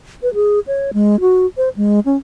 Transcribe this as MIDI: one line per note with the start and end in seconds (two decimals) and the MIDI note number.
0.23 0.33 71
0.34 0.59 68
0.67 0.91 73
0.93 1.20 56
1.20 1.46 66
1.57 1.69 72
1.76 2.00 56
2.06 2.16 61